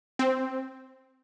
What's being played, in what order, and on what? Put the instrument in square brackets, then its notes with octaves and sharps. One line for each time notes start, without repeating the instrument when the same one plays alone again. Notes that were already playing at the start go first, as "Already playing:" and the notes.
[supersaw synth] C4